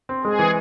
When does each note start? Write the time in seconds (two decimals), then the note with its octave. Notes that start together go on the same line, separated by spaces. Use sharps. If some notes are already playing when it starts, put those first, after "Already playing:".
0.09 C4
0.24 G#3 G#4
0.39 E3